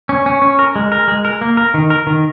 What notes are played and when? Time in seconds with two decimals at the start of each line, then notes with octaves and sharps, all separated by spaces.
0.09 C#4
0.26 C#4
0.42 C#4
0.59 A#4
0.76 G#3
0.92 A#4
1.08 G#3
1.25 A#4
1.41 A#3
1.57 A#4
1.74 D#3
1.90 A#4
2.07 D#3